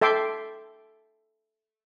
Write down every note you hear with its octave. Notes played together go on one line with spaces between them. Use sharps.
A4 E5 G5 C6 D6